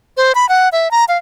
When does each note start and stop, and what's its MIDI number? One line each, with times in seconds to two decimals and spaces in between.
0.17 0.32 72
0.35 0.48 83
0.49 0.69 78
0.72 0.91 76
0.91 1.04 82
1.08 1.18 77